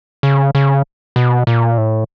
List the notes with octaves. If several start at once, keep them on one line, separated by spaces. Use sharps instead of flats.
C#3
C#3
B2
A#2
A2